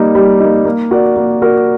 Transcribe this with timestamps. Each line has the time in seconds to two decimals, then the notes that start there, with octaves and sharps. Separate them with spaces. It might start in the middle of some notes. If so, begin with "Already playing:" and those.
Already playing: G3 A#3 D#4
0.15 G3
0.40 A#3 D#4
0.65 A#3
0.91 F#4 A#4 D5
1.16 A#3
1.42 F#4 A#4 D5